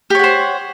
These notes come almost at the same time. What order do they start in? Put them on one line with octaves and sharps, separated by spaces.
G4 C#5 F#5 C5